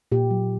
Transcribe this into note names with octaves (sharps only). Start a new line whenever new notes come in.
A#2 G4
F#3